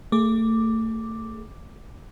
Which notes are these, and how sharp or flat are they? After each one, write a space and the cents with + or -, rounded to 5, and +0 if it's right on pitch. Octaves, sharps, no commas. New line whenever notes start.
A3 +30 G#4 +0 D6 +0